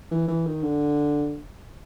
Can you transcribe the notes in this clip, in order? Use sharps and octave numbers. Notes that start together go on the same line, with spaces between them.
E3
E3
D#3
D3